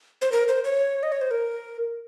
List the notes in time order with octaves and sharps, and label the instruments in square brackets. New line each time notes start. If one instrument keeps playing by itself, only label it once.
[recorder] C5
A#4
C5
C#5
D#5
C#5
C5
A#4